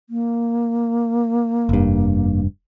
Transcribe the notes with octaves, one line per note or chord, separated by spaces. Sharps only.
A#3
F1 G2